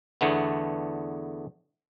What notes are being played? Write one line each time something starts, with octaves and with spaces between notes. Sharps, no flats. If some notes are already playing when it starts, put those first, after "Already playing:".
E2 D3 A3 B3